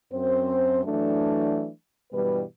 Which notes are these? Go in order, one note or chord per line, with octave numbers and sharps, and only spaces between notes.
F#2 C4 C5
E3 F#3 A3 D4
G2 B2 E3 G3 B4